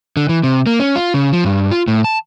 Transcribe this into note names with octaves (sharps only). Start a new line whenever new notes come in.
D3
E3
C3
A#3
C#4
F4
C#3
F3
G2
F4
A2
A5